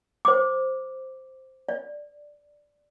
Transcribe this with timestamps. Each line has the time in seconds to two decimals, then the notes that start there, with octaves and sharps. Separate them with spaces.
0.25 C5 D6
1.69 D5